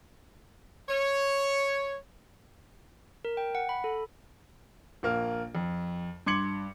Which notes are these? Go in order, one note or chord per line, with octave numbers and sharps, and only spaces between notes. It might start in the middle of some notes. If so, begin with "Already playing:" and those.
C#5
A#4
G5
F#5
B5
A4
A#1 A#3 F6
F2
G2 C6 D6 G#6 C#7 F#7